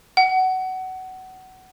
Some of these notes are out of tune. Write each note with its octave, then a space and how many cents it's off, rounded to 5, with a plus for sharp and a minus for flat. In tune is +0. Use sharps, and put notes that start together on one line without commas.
F#5 +20